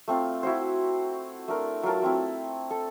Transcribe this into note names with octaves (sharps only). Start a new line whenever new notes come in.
A3 C4 F4 F5
E4 F#4 C5
A3 D4 A#4
F#3 F4 A#4 A5
A3 C4 E4
A4